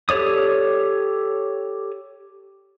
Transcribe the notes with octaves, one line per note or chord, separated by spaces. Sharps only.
G4 A4 C#5 D5 D#6